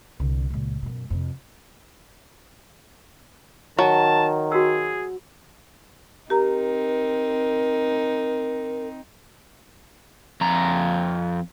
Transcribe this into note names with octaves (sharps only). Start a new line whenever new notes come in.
C2 D3
C#2 A#2
F#2 B2
F2 C3
D#3 F#3 A5
F#4 G#4 E6
C4 D#4 G4 A#4 A#5
F2 A#5